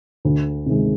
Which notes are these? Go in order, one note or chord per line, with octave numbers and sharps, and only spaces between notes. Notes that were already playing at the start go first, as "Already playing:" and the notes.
D2
C3 D#3 G#3